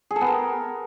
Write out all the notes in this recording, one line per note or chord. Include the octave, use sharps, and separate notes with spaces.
G#4
A4
B3
A#4